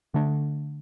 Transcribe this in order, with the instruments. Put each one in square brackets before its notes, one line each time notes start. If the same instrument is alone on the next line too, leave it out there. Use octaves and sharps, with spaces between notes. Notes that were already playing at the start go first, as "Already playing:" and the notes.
[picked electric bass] D3 A3 D4